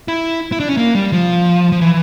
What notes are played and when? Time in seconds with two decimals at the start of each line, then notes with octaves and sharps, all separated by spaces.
0.08 E4
0.52 E4
0.60 D4
0.69 C#4
0.77 A#3
0.95 G3
1.12 F3
1.72 F3
1.81 E3